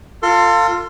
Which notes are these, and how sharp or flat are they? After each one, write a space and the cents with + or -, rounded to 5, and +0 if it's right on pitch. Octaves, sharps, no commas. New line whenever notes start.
F4 +0 A4 +35 C6 +0